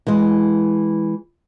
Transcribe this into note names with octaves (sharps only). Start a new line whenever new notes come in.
E3 G#3